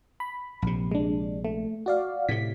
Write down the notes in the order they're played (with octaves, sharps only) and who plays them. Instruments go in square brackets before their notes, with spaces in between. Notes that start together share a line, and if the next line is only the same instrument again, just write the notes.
[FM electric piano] B5
[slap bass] A#1 C3
[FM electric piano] G#3 D4
A3
F#4 D5 F5
[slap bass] A2 C3 [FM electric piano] B6